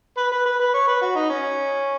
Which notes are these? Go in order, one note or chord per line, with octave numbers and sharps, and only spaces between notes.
B4
B4
B4
B4
C#5
B4
F#4
D#4
C#4